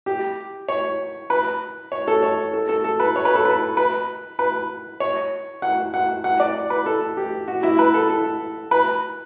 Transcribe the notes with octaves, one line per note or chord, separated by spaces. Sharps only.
G4
C#5
B4
C#5
A4
C#5
A4
A4
A4
B4
C#5
B4
A4
B4
B4
B4
C#5
F#5
F#5
F#5
D5
B4
A4
G4
F#4
E4
B4
A4
A4
B4